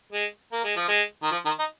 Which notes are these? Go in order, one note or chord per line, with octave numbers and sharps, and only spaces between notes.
G#3
A#3
G#3
F3
G#3
D#3
F3
D#3
D#4